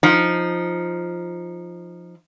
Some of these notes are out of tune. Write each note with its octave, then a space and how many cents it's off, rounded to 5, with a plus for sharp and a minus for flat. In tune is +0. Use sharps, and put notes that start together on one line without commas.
F3 +0 D#4 +0